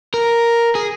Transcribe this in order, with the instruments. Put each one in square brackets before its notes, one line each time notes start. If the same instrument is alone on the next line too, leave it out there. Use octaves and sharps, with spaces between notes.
[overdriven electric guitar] A#4
G#4